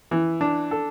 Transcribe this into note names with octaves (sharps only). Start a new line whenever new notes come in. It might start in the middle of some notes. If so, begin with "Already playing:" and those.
E3
D4
A4